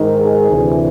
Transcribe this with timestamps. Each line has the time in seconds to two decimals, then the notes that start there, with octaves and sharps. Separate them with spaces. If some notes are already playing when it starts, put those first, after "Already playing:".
Already playing: G#2 D#3
0.21 G#4
0.51 D2 C3 E3